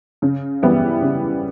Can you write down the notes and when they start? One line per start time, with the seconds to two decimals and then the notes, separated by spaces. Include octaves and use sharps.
0.22 C#3
0.62 E3 G3 B3 E4
1.02 C#3